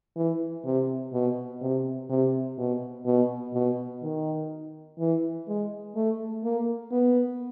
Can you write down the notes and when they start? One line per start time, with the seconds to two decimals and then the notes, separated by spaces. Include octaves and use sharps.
0.16 E3
0.65 C3
1.13 B2
1.61 C3
2.10 C3
2.58 B2
3.06 B2
3.54 B2
4.02 D#3
4.99 E3
5.48 G#3
5.96 A3
6.44 A#3
6.92 B3